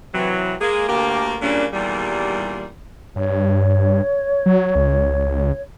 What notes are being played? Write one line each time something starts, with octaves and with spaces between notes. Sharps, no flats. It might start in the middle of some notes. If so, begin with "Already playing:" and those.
C3 E3 F#3
G#3 A#3 G#4
D2 A#3 G4
A#2 C#3 G3 A#3 C#4 D4
E2 A#2 D#3 G3
G2 C#5
F#3
C#2